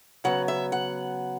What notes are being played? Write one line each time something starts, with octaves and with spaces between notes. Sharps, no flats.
C#3 F#3 B3 F#5
E5
F#5